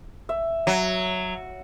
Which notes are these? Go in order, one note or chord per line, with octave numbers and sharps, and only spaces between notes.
E5
F#3